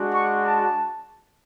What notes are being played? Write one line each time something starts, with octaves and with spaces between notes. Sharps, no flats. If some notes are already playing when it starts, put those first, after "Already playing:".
Already playing: G#3 D4 F#4
C#6
A5